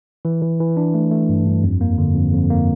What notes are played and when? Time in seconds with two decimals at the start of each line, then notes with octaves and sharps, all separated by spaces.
0.25 E3
0.42 E3
0.60 E3
0.77 D4
0.94 A3
1.11 A3
1.29 G2
1.46 G2
1.63 F2
1.81 A#3
1.98 D3
2.15 F2
2.33 F2
2.50 A#3